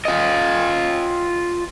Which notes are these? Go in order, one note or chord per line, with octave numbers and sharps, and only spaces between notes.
F4 D#5